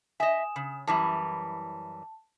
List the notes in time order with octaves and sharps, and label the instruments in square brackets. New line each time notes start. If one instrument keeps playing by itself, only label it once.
[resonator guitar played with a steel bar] D#5 E5 [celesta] G#5 D#6 E7
[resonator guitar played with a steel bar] C#3
[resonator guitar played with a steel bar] F#2 E3 G3 [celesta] A5